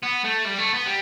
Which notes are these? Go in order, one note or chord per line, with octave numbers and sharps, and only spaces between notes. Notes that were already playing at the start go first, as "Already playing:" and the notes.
B3
A3
G3
A3
B3
G3